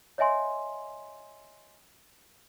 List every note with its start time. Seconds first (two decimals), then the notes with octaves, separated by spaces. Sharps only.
0.18 C#5 D#5 E5 G#5 C6